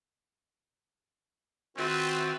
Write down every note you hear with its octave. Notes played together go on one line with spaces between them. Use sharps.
D#3 C4 F4 F#4 B4 E5